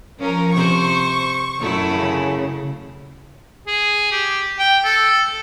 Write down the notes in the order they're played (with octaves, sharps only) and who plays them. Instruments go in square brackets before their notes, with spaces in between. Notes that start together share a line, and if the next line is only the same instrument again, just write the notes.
[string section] F3 A#4 [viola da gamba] C#4
[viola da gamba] C3 C5 [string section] C#6
[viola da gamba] F#2 A3 E4
[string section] C#3
[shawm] G#4
G4
G5
A4